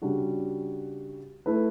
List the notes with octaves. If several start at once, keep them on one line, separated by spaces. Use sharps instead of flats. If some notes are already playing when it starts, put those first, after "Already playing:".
C#3 G3 D4 F#4
A3 E4 B4